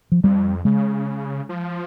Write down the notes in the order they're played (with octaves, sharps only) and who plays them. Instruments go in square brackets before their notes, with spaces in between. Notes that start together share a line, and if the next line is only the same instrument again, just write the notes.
[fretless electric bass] F3
[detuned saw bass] F2 [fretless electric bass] G3
[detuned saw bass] C#3 [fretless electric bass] G#3
[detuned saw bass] F3